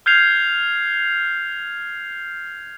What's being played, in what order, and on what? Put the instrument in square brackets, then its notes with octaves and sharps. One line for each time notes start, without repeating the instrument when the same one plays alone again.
[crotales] F6 G6 G#6 C7 F7